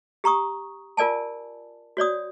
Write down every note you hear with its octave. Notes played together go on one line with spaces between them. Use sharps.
G4 A#5 C#6 D#6
F4 A#4 D5 G#5 A5
F#4 C#5 D5 D#6